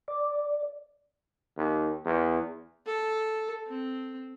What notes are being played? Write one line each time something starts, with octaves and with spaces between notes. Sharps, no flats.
D5
D#2
E2
A4
C4